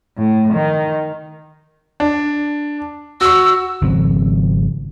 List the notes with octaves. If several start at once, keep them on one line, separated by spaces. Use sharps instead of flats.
A2
D#3
D4
F#4 C#6 E6
G#1 C#3 F3 C4